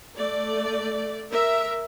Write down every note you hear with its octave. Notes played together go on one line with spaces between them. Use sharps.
A3 D5
A#4 E5